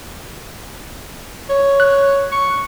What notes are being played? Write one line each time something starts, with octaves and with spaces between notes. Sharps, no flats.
C#5
F#6
C#6